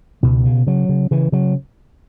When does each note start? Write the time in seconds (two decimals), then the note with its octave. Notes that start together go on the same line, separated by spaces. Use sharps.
0.23 C#2 B2 B3
0.45 C#3
0.67 C#3 F#3
0.89 C#3
1.11 C#3 E3
1.32 C#3 F#3